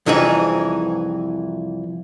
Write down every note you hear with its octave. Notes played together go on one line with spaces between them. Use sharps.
C2 F2 E3 D#4 G#4